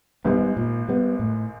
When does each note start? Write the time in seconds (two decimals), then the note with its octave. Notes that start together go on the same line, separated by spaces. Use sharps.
0.25 G#1 G#2 G3 B3
0.57 A#2
0.89 G3 B3
1.19 A2